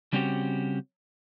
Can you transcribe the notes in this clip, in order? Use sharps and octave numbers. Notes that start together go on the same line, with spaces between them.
C#3 G3 C4 C#4 F#4 G4